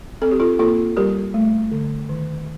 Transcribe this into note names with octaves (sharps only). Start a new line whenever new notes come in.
C4 A4
G4
F4 A4
A#3 F4 A4
G3 G4 A#4
A3
D3
D#3